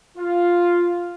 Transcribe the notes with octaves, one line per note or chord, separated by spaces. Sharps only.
F4